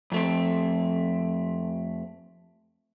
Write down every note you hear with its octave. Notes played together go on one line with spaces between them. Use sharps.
F2 A3 C4